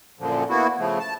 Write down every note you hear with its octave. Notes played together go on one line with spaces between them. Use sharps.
F#2 A#2 D3 F3
A#3 B3 E4 F#4
C#3 F3 A3
A5